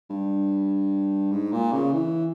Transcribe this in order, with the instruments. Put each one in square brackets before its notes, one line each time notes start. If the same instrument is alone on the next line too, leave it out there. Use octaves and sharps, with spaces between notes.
[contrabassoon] G2
G#2
A#2
C#3
E3